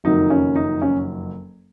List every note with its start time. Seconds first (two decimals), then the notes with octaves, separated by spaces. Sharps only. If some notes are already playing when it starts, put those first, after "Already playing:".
0.04 F#1 F2 D#3 F#3 D#4
0.30 C#4
0.56 D#4
0.82 C#4